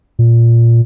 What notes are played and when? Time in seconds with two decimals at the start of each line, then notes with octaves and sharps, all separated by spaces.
0.19 A#2